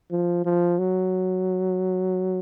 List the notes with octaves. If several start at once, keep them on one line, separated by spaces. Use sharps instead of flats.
F3
F3
F#3